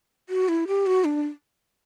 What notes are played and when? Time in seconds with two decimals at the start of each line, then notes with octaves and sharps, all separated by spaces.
0.29 F#4
0.48 E4
0.67 G4
0.86 F#4
1.04 D4